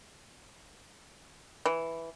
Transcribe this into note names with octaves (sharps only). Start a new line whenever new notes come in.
E3